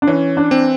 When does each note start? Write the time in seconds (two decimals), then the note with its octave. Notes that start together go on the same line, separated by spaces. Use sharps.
0.02 D4
0.07 E3 C#4
0.37 D4
0.51 C4